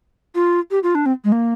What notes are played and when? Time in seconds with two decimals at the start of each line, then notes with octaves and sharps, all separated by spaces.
0.35 F4
0.71 G4
0.83 F4
0.95 D4
1.06 C4
1.24 G#3
1.32 A#3